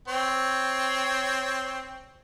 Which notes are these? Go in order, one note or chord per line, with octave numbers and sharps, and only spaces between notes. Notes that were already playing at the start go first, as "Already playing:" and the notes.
C4 C#5